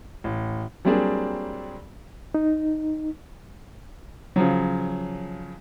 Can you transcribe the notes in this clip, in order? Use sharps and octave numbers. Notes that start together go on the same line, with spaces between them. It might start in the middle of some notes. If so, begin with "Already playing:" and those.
A1
F#3 G3 A#3 C4 D4 G#4
D#4
C#3 F3 F#3